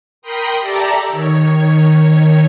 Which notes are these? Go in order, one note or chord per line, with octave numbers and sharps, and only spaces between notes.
A#4 G5 B5 C6 D#6
G4 A4 D5 E5 A#5
D#3 C#5